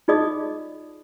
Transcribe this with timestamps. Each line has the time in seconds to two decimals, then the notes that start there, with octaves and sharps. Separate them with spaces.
0.08 D#4 F4 G#4 D5 D#5 D#6